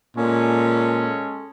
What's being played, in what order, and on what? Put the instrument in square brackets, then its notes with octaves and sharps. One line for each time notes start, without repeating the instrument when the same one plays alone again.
[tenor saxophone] A#2 [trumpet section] G#3 C#4 A4